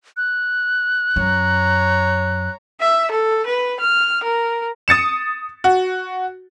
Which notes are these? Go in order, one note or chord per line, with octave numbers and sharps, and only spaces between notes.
F#6
F#2 C#5 A#5
E5
A4
B4
F6
A#4
D#6 A6 C#7 E7
F#4